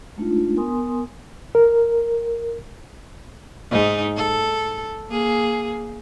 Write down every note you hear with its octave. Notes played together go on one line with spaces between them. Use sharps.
G#3 A3 D4 D#4 F4
B3 A#4 G#5 C6 D#6
A#4
G#2 D#4
A4
A#3 G#4